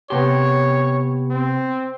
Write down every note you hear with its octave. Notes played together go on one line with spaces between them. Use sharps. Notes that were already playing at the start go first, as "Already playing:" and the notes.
C3 B3 G4 C#5 A5 C6
C4